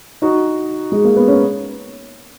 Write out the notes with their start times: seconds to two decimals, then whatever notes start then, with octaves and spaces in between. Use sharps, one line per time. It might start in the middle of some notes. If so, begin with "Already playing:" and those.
0.22 D#4 F#4
0.92 G#3
1.05 A#3
1.16 B3
1.28 C#4